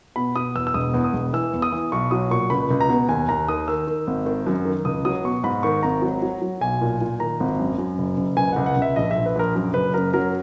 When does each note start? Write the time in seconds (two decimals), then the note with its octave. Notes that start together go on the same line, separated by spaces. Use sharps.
0.16 B2 B5
0.36 B2 D#6
0.55 E2 E6
0.67 E6
0.74 E1 D#6
0.94 E2
1.04 D#6
1.13 E1
1.33 E3 E6
1.53 E2
1.62 D#6
1.72 E3
1.92 B1 C#6
2.11 F#3 D#6
2.31 A#2 C#6
2.50 C#2 B5
2.71 C#2
2.81 A#5
2.89 B2
3.09 D#2 G#5
3.28 D#2 A#5
3.48 D#3 D#6
3.68 D#3 E6
3.87 D#3
4.07 G#1
4.26 D#3
4.46 F#2
4.65 D#3
4.85 C#2 D#6
5.05 F#3 D#6
5.24 B2 C#6
5.43 G#2 B5
5.63 D#3 C#6
5.83 G#1 A#5
6.02 F#3
6.22 F#3
6.42 F#3
6.61 B1 G#5
6.81 A#2
7.01 A#2
7.20 D#3 A#5
7.40 G#1
7.59 F#2
7.78 F#2
7.98 F#1
8.17 F#1
8.37 C#2 G#5
8.53 C#2 F#5
8.66 F#5
8.77 C#2
8.82 E5
8.96 A#1 D#5
9.11 A#1 E5
9.26 B4
9.35 A#1 A#4
9.55 F#2
9.74 F#1 B4
9.94 F#2 A#4
10.14 F#3 A#4